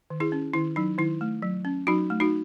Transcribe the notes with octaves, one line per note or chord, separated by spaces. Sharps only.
D#3
E4 G#4
C#4
D#3 E4
F#3 D#4
D#3 E4
A3
F#3
C#4
F#3 D#4 F#4
A3
D#4 F#4